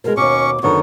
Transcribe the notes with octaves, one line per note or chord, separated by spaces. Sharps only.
B2 G#3 A#4
D#2 B2 C#4 C#6 D6
F#2 D3 D#3 B3 F#4